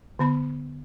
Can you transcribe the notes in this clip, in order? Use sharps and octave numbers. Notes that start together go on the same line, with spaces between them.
D3 B3 B5